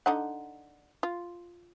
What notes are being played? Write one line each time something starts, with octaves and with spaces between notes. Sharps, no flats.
D3 D#4 F#5
F4